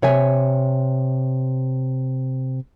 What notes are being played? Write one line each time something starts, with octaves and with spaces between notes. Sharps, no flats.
C3 C#5 E5 G#5